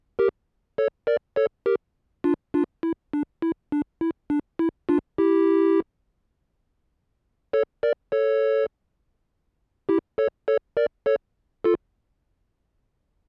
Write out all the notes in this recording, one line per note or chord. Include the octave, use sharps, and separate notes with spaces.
G4 A#4
A4 C#5
A#4 D5
A4 C#5
G4 A#4
D4 F4
D4 F4
E4
D4
E4
D4
E4
D4
E4
D4 F4
E4 G4
A4 C#5
A#4 D5
A4 C#5
E4 G4
A4 C#5
A4 C#5
A#4 D5
A4 C#5
F4 A4